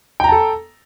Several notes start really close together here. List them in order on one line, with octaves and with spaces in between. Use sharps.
G5 A#5 A5 A4